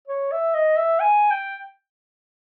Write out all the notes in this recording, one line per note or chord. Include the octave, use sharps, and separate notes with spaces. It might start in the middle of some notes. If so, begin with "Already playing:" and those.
C#5
E5
D#5
E5
G#5
G5